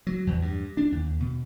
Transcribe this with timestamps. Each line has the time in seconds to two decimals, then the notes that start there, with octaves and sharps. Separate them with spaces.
0.07 F#3
0.27 E2
0.42 G2
0.77 D4
0.92 D#2
1.20 B2